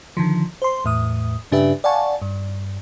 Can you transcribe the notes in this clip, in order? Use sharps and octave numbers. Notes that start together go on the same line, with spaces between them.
D3 D#3 F3
C5 C6
E2 A2 D#6
G2 C#3 D4 G4 B4 E5
D5 F5 F#5 G#5 A5 C#6
G2